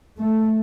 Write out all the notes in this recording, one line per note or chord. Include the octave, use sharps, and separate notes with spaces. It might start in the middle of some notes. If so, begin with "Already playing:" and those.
A3